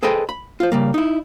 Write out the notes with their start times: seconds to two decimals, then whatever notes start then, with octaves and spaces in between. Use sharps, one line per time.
0.03 G#4 A4 B4 C5 D#5 G5
0.29 B5
0.60 F4 C5
0.72 C#3 G3 A#3
0.94 D#4 E4